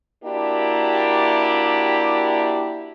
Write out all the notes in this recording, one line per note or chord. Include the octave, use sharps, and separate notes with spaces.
A#3 D4 E4 F#4 G4